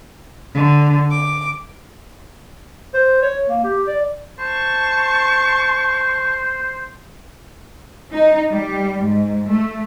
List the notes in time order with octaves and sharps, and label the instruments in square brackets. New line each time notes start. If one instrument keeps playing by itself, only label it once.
[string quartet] D3
D6
[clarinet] C5
C#5
A#3
G4
D5
[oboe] C5 [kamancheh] A5 C#6
[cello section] D#4
G3
G#2
A3